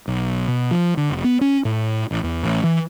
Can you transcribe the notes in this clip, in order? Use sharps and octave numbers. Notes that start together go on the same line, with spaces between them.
B1
B2
F3
D3
F1
B3
C#4
A2
A1
E2
A1
E3